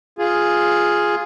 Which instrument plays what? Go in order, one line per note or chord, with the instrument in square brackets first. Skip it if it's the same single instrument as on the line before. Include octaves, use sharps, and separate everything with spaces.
[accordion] F4 G#4